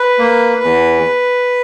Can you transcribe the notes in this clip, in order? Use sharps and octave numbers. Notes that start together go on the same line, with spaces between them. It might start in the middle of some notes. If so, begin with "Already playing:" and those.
Already playing: B4
A#3
E2